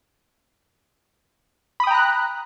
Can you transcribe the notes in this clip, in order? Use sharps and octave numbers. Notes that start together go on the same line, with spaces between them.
G5 A#5 B5 D#6 F#6